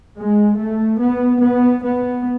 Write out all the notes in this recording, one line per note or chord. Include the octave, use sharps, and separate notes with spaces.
G#3
A3
B3
B3
B3